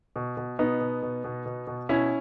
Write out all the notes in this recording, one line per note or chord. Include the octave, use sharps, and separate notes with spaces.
B2
B2
B2 B3 D#4
B2
B2
B2
B2
B2
B2 C#4 E4